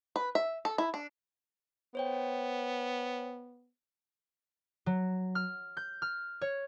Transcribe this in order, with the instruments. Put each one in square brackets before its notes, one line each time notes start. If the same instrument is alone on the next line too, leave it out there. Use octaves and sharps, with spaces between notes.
[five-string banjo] B4
E5
A4
E4
D4
[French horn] B3 [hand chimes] C5 C#5 G5
[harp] F#3
F6
G6
F6
C#5